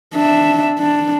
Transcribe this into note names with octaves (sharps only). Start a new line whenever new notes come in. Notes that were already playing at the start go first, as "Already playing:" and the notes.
D4 E5
D4